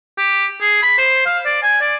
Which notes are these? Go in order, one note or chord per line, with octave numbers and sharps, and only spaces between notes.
G4
G#4
B5
C5
F5
D5
G#5
D5